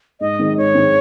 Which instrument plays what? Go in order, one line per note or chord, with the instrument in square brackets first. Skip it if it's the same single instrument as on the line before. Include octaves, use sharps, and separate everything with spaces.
[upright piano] G#2 [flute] D#5
[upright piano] D#3 G#3 C4
[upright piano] G#2 [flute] C#5
[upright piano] D#3 G#3 C4